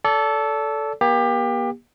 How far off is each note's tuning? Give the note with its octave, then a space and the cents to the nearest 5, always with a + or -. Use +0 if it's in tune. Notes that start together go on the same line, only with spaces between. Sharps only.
A4 -5 D5 -35
A#3 +40 G4 +25